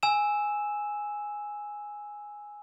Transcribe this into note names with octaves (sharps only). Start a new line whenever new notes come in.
G#5 E6 E7